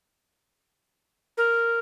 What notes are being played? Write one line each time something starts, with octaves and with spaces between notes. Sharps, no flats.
A#4